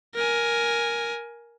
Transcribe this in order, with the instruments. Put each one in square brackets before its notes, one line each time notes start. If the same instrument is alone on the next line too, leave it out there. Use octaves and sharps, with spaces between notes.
[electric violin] A#4 G#5